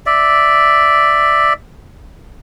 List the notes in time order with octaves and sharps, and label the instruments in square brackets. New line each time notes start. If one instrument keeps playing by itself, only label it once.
[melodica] D5 E5